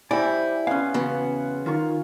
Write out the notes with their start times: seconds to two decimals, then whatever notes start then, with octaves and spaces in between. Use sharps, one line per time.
0.11 G3 E4 C5 D5 E5 G#5
0.67 B3 C#4 F5 G#5 C6
0.94 E2 C#3 B3 F#4 C6
1.66 D#3 F4 C#6